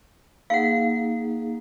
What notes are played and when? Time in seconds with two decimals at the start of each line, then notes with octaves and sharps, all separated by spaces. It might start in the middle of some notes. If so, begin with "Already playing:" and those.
0.50 A#3 D#4 G#4 F5 F#5